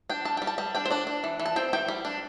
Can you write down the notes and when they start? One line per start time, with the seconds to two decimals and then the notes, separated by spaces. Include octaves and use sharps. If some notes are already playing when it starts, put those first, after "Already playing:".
0.10 D4 G5
0.25 G3 A5
0.37 G3 G5
0.47 A5
0.58 G3 A5
0.75 D4 G5
0.86 C5
0.91 D4 D5
1.07 D4
1.24 E3
1.40 E3
1.46 A5
1.56 C4 G5
1.73 E3 G5
1.88 G3
2.05 D4